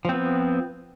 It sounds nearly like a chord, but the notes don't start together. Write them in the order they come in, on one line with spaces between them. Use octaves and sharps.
F3 C4 B3